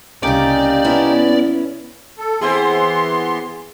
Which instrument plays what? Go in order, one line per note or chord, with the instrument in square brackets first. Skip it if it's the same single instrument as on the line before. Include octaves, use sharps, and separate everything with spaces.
[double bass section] C2 [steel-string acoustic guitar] C#3 C#4 [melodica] A#3 D#4 G4 [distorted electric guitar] D5
[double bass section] B3 [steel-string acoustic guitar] C#4 E4
[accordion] A4
[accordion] E3 B3 C6 [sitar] C4 E4 G#4